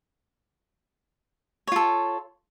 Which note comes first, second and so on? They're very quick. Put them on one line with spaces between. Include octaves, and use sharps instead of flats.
C#5 F4 A4